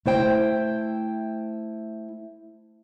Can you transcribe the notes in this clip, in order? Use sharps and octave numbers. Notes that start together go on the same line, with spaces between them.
A3 E4 C5 G5